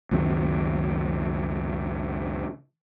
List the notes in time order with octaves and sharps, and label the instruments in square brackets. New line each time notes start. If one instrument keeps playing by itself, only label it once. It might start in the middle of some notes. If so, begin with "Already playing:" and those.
[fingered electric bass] C#2 F#2 D#3 C4